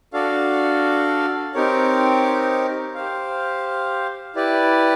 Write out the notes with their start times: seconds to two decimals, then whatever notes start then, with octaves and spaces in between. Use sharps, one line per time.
0.13 D4 F#4 A4 D5 F5
1.54 C4 D#4 G4 A#4 C#5
2.95 G4 C5 F5
4.35 E4 G4 B4 D5